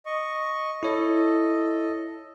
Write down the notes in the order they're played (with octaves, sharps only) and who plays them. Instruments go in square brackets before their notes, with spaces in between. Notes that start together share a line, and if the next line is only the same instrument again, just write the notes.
[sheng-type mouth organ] D#5 C#6
[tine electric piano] E4 C#5 [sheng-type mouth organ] A4 D#5